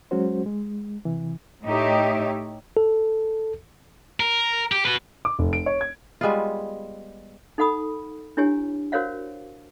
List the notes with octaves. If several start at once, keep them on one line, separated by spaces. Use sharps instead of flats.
F#3 G#3 C#4 F#4 C5
G#3
C3 E3
A2 A3 D#4 G4 C#5 E5
A4
A#4
G4
F#4 B4
D6
F1
D7
C#5
G#6
G3 G#3 B3 F4
D#4 A4 F#5 B5 D#6
D4 E4 G4 C#5 G#5
F#4 A#4 C5 C#5 F5 F#5